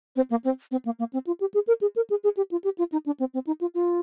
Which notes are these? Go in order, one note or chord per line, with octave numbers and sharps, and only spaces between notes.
C4
A#3
C4
C4
A#3
A#3
C4
F4
G4
G#4
A#4
G#4
A#4
G#4
G#4
G4
F4
G4
F4
D#4
D4
C4
C4
D#4
F4
F4